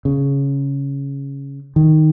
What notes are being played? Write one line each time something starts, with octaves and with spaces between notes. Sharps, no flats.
C#3
D#3